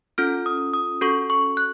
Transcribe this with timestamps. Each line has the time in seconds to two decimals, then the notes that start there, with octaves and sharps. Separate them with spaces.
0.18 C#4 F4 A4 F6
0.46 D#6
0.74 D#6
1.01 C#4 F#4 A4 C#6
1.30 C#6
1.57 F#6